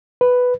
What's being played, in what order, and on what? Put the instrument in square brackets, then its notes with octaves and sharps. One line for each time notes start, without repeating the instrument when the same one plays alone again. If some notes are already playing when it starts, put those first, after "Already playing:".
[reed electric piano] B4